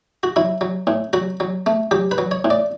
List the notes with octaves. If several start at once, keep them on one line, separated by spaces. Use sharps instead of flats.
F#4
F#3 E4
F#3
A2
F#3 F#4
F#3
A3
F#3 G4
B4
F#3
C#5
A2
D5